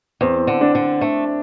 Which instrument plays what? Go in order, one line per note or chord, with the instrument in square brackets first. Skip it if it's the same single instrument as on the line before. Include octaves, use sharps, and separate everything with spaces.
[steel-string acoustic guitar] E2 [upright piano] C4
[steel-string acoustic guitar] D3
[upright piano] D4
[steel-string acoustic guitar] D3
A3